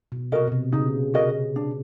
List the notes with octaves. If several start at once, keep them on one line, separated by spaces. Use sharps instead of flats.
B2
C3 F#4 A#4 D#5
B2
C3
C#3 D#4
F#4 A#4 D#5
D4